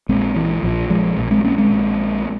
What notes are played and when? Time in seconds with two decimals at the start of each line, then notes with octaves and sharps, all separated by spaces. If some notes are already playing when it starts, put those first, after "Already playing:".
0.09 A#1 A#2 G#3 C4
0.36 E3
0.63 A#1 A#2 F3
0.90 F3 G#3
1.17 A#1 A#2
1.31 G#3 C4
1.44 A#3 C#4
1.58 G#3 C4
1.71 A#1 A#2